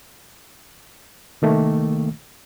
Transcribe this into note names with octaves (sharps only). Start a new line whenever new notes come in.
C2 D#3 A3 A#3